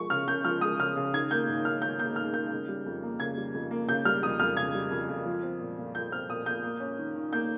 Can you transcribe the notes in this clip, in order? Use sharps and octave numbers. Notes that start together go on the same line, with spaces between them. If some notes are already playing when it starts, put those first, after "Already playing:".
Already playing: F3 G#3 C#6
C#3 F6
C#3 G6
F3 F6
G#3 D#6
C#3 F6
C#3
D#3 G#6
A#3 G6
G#2
D#4 F6
D#3 G6
A#3 G6
G#2 F6
D#4 G6
C#3
G3
F2
A#3
C#3 G#6
G3
F2
A#3
C#3 G6
G3 F6
F2 D#6
F2 F6
C#3 G#6
G3
F2
F2
F3
C4
A#2
A#2
F3 G6
C4 F6
A#2 D#6
A#2 G6
A#3
C#4
D#3
D#3
A#3 G6